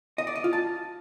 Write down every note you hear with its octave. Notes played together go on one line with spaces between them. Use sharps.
D#5
D5
D#5
F4
A5